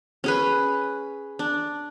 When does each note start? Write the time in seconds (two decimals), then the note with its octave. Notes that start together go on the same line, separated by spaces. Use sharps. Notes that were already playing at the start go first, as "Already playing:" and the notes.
0.24 C#4 G#4 B4
1.39 D4